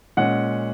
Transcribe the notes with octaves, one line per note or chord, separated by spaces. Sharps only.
A#2 G#3 C#4 F#5